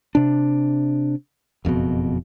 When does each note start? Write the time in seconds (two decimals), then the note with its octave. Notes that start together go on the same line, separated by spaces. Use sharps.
0.15 C3 D4
1.65 F#1 F2 G#2 B2